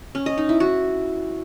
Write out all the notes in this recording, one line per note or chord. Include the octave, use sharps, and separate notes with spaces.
C#4
D#5
D#4
E4
F#4